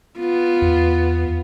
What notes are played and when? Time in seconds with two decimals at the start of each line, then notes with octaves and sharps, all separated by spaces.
0.18 B3 F4
0.62 E2